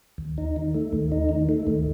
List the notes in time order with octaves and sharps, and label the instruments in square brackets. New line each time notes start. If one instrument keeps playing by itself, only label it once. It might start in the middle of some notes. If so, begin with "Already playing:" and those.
[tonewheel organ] D#2
D#4
D#3
A3
D#2
D#4
D#3
A3
D#2